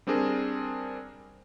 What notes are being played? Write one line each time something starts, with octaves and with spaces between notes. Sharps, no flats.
G3 C4 D4 G#4 A#4